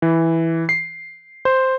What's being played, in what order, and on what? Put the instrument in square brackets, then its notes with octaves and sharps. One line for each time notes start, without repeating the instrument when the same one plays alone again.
[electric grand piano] E3
C7
C5